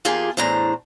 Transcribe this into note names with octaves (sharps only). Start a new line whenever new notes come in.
E2 A#3 F4 G4 G#4 A5
E2 A2 D4 C5 A#5